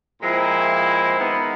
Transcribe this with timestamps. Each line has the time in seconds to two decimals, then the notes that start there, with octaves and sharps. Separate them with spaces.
0.22 A#2 F3 G#3 C4 E4
1.18 D#3 G#3 B3